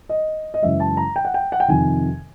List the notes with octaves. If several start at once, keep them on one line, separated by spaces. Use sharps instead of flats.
D#5
D#5
F#2 C#3 E3 G#3 E5
A5
A#5
G5
F#5
G5
F#5
G5
F2 C3 D#3 G#5